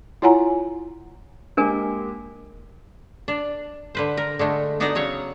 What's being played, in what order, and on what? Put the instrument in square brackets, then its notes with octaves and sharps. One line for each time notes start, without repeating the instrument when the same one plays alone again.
[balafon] E4 F4 C#5 F#5 G#5 A#5
[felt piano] G#3 A#3 G4 [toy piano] D4 A#4 G#5
[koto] D4
D3 B4 C5
A#4
D3 G#3 A3
B3 D4 D#4 F#4 D5 A#5
C#3 F#3 C#5